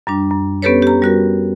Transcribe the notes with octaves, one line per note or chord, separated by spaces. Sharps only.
F#2 G3 D4
F#2
B3 C#4 G4 A4 B4 C#5
G4 A#5
G3 F#4 A#4